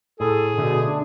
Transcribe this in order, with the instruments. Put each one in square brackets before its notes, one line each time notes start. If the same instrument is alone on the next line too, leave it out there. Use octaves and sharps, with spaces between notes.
[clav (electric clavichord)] A2 [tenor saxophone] G#4 [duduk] A4
[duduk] B2 [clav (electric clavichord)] D3 A3
[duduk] D4